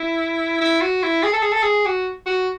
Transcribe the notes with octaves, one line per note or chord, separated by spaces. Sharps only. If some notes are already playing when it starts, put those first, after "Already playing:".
Already playing: E4
E4
F#4
E4
G#4
A4
G#4
A4
G#4
F#4
F#4